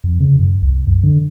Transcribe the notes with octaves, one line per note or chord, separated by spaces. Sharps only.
F2
C#3
F#2
C2
F#2
D3